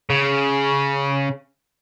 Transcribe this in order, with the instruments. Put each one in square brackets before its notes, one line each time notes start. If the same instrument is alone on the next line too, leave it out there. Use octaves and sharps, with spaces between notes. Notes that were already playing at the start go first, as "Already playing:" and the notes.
[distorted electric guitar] C#3